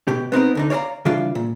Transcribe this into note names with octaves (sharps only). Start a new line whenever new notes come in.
B2 G4
B3 C4 D#4 A#4
D2 D3 D#4
C#5 D5 F5 A5 A#5
C#3 E3 G3 D4 F4 F5
A#2